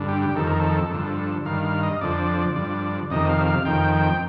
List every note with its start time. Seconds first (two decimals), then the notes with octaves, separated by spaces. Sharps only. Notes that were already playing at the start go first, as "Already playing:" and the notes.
Already playing: G2 D3
0.08 G4
0.22 G4
0.35 F2 D#3 A4
0.47 A#4
0.59 A4
0.91 G2 D3 F3
1.45 G2 D#3 F5
1.65 F5
1.83 D#5
2.01 F2 D3 F3 D5
2.56 G2 D3 F3
3.10 F2 C3 D#3 D#5
3.30 F5
3.47 F5
3.65 F2 D#3 G5
3.93 G5